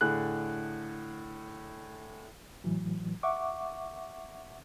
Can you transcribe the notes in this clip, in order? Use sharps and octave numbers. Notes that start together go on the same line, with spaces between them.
A2 D3 G#4 F#6
A2 E3 F#3
E5 F#5 C#6 D6